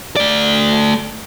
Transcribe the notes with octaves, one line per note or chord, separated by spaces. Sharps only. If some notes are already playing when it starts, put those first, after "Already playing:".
A3 D5